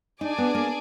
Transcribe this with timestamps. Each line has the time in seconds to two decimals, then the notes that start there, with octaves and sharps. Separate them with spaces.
0.21 D4 D#4 G#4 D5 G#5
0.38 B3
0.55 A#3